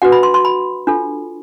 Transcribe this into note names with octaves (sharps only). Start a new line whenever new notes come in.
D4 F#4 B4 F#5
B5
C6
C6
B5
D4 F4 A4